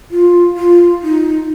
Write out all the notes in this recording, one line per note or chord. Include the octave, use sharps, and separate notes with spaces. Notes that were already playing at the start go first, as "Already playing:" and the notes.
F4
F4
D#4